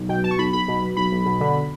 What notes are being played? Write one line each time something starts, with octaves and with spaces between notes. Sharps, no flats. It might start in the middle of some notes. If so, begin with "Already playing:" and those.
Already playing: B1
B2 G5
B2 A5
C#6
B1 B5
B1 B5
B2
B2
B1 B5
B1
B2
D3